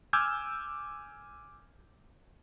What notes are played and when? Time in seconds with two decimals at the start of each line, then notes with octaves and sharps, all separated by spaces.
0.13 G#5 D6 E6 F6 G6 G#6